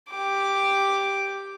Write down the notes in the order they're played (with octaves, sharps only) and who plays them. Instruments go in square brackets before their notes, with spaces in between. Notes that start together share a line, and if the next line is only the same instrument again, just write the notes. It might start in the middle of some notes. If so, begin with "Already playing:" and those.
[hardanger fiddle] G4 D6